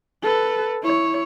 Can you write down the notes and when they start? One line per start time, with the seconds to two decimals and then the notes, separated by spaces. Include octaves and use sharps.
0.23 A4 B4
0.82 E4 C#5